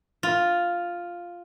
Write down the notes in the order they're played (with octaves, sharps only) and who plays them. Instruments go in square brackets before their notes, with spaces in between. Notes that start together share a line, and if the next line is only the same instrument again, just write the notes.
[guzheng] F4